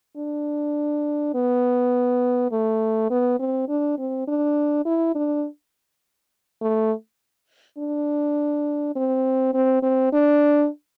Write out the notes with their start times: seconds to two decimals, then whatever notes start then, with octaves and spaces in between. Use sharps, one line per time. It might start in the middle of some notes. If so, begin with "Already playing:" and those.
0.17 D4
1.35 B3
2.52 A3
3.10 B3
3.39 C4
3.69 D4
3.98 C4
4.28 D4
4.85 E4
5.15 D4
6.61 A3
7.78 D4
8.95 C4
9.54 C4
9.83 C4
10.13 D4